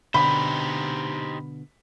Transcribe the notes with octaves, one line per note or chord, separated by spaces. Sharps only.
B2 D3 D#4 G4 C5 B5